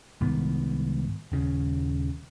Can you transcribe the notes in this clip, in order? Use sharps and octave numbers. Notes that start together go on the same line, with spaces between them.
C2 G#2 D#3 B3
D#1 C#3